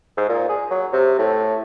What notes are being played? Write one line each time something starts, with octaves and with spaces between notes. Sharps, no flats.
G#2
A#2
G#4
F#3
C3
A2